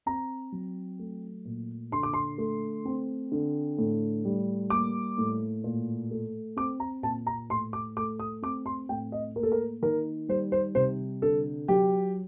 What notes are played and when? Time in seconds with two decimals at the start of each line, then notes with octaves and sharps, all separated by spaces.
0.06 C4 A#5
0.52 F#3
0.99 A3
1.45 A#2
1.92 D3 C6
2.03 D6
2.13 C6
2.38 A3
2.85 C4
3.32 D3
3.78 A2
4.25 G3
4.70 A#3 D6
5.18 A2
5.64 A#2
6.11 A3
6.57 C4 D6
6.80 A#5
7.03 A#2 A5
7.27 A#5
7.49 A2 C6
7.73 D6
7.97 A3 D6
8.20 D#6
8.42 C4 D6
8.66 C6
8.89 A2 G5
9.12 D#5
9.36 A#3 A#4
9.43 A4
9.52 A#4
9.82 D#3 A#4
10.28 G3 C5
10.52 C5
10.75 C3 C5
11.22 D3 A4
11.68 F#3 G4